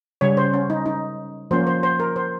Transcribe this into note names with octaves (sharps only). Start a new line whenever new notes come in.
C#3 G3 C#4 C#5
C5
C#4
D#4
D#4
F3 A#3 C#4 C5
C5
C5
A#4
C5